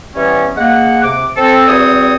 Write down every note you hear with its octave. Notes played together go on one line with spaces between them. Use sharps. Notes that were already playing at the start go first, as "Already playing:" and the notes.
E3 G3 B3 C#4
G#3 A#3 F#5
C3 D6
C4 A4
E2 G3 C4 F#4 C#5 D#6